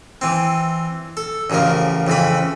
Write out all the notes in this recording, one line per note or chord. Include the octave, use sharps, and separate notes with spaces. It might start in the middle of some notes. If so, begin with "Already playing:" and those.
E3 C4
A4
A1 F#2 C#3 F3 A#4
F2 C#3 E3 B5